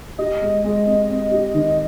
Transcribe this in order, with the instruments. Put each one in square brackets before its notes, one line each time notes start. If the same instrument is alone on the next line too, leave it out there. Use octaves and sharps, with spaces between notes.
[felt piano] G4 [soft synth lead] D#5
[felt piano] G#3
G#3
C4
C4
G4
D#3